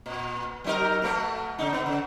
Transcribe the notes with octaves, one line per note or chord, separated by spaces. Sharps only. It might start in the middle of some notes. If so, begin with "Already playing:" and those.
A#2
F#3 D#4 A#4
B2 A3 B3
C#3 D#4
B3
C#3